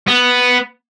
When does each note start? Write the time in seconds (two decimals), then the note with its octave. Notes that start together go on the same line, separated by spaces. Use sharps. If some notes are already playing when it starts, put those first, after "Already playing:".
0.08 B3